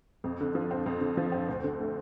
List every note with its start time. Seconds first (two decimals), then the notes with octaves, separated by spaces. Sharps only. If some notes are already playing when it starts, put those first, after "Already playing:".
0.24 F2
0.41 D3
0.55 F3
0.71 C4
0.86 F2
1.01 D3
1.17 F3
1.32 C4
1.49 D2
1.64 D3
1.80 A3